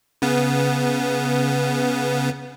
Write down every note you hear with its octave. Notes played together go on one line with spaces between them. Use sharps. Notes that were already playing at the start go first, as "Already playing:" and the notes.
C#3 B3